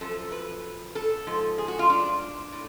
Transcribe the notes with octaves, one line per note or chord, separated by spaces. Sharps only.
F#2 F3 A4
B4
A4
G#2 F3
G#4
F#4
F4
D4
A2